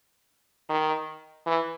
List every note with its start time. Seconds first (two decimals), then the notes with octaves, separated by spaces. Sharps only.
0.69 D#3
1.46 E3